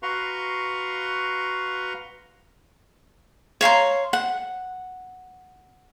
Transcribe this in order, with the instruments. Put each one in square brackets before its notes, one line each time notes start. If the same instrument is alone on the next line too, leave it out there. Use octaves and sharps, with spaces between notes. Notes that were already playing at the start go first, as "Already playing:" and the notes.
[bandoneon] F#4 B4 F5 A#5 C6 C#6
[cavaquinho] C#5 F5 A#5 C6
F#5